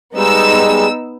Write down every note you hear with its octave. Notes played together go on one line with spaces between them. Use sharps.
G3 G#3 B3 D#4 E6